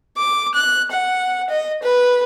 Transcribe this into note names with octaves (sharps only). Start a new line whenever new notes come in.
D6
F#6
F#5
D#5
B4